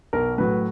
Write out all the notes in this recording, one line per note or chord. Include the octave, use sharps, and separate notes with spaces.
B1 A#4
A2 F#3 B4